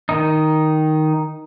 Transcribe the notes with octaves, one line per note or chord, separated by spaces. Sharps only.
D#3 D#4